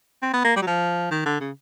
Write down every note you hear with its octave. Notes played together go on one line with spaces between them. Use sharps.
C4
B3
A#3
G3
F#3
F3
D#3
D3
C#3